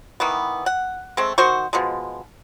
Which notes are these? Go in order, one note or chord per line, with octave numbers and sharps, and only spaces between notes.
D#3 E3 B3
F#5
G#3 A3 C4
D#3 F#4 C5 C#6
B2 F3 G#3